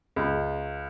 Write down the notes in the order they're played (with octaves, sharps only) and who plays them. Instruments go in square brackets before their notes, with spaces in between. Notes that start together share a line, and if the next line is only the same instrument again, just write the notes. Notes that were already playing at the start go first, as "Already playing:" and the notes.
[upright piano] C#2